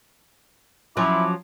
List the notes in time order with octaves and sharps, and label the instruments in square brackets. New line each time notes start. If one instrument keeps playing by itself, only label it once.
[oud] F3 F#3 C#4 [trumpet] E4 [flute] D6